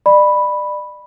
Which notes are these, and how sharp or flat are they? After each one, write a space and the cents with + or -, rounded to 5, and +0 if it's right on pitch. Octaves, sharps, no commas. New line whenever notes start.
D5 +30 B5 +0